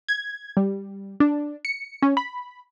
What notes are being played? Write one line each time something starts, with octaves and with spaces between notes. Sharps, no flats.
G#6
G3
D4
C#7
C#4
B5